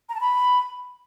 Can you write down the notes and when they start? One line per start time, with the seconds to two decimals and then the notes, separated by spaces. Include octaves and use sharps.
0.09 A#5
0.15 A5
0.21 B5